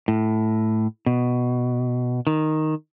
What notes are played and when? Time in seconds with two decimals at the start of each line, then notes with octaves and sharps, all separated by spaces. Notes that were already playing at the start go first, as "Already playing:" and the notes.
0.08 A2
1.06 B2
2.27 D#3